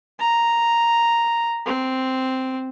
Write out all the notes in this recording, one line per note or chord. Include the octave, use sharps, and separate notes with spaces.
A#5
C4